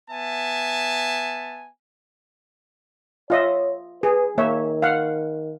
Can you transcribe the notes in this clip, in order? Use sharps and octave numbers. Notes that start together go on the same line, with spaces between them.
B3 E5 G#5 A5
F4 C#5 D#5 E5
G#4 B4
D#3 A#3 C#5 E5
F5 F#5